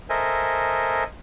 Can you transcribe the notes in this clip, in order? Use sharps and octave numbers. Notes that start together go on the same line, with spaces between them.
A4 A#4 C5 D#5 E5 G#5